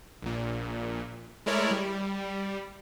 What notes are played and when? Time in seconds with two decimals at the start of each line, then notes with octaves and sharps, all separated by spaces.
0.22 A#1 A#2
1.46 G#3 A3 E4 A#4 C#5 D5
1.70 G3